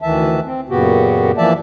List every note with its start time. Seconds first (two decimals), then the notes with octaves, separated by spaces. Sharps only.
0.02 D2 D#3 E3 E5 A5
0.45 C4
0.69 F#2 A#2 C#3 B3 F#4 G4
1.38 E3 F3 A#3 D5 E5 A5